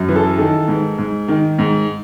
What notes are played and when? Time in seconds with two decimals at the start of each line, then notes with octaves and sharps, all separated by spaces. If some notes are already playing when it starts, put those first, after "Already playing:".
Already playing: F#2
0.09 E3
0.16 A4
0.38 D#3 A4
0.68 G#2
0.98 G#2
1.28 D#3
1.59 G#2